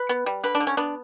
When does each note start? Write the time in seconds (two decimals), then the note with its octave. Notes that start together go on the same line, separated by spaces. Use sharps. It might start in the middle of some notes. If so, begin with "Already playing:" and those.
Already playing: B4
0.09 B3
0.26 G3
0.44 D3 B4
0.55 D4
0.60 D3
0.67 C#4
0.77 B3 D4